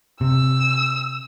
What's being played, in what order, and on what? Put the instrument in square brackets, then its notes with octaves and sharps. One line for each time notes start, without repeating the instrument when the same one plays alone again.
[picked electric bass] C3 [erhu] E6